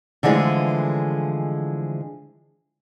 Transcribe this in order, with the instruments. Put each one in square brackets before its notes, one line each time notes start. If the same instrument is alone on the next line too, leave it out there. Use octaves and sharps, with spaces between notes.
[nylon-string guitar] D3 E3 F3 G#3 A3